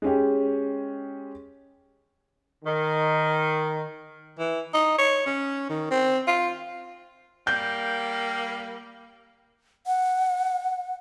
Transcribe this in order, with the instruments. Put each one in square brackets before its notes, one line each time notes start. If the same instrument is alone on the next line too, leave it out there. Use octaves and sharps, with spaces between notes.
[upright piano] G#3 C#4 G4
[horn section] D#3
[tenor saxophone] E3
D#4
C#5
C#4
D#3
C4
F4
[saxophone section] G3 A#3 [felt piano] G6
[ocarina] F#5